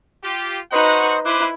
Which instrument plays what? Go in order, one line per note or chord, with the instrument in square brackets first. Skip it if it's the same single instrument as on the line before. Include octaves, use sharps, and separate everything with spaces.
[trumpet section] F4 G4
[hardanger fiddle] D#4 B4 [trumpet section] F#4 F#5 [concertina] C5 D#5
[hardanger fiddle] E4 [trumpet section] B4 C5 [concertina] D6 F#6